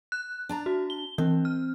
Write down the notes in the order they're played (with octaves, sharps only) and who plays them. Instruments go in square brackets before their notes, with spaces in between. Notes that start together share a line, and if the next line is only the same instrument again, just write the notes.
[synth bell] F#6
[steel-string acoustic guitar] D4 A5 A#5
[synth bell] F#4
G7
[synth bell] E3 [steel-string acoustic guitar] C4
[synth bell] F6